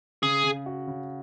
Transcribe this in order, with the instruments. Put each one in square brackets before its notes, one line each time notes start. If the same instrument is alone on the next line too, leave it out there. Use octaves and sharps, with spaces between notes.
[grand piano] C#3 [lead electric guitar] G#4
[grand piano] C#3
F#4
C#3